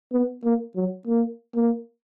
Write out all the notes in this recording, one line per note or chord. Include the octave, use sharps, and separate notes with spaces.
B3
A#3
F#3
A#3
A#3